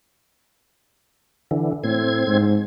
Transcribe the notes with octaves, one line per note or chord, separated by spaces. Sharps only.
D3 E3
A2 C4 G#6
G#2